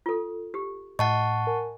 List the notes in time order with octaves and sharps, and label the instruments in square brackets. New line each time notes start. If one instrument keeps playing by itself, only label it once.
[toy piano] F4 A4
G4
[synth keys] A2 [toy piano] D#5 [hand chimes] F#5 A5 C#6
[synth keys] A#4 G#5